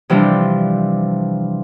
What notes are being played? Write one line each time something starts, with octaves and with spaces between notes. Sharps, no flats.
C3 E3 F3 G3 D4